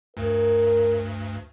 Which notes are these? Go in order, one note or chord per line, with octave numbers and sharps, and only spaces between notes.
D2 G2 A#4